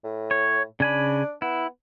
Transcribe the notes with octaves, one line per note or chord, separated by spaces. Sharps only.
A2
C#5
C#3 D4 G#5 B5
B3 E4